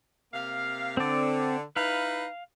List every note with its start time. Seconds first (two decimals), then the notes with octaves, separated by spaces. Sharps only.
0.34 C3 A#3 F5
0.97 D3 C4 D5
1.76 D#4 E4 B4 F5